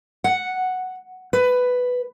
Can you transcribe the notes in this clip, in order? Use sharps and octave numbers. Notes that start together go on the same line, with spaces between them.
F#5
B4